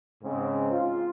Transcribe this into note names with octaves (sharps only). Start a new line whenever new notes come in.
G#2 C#3 G#3 C4
F4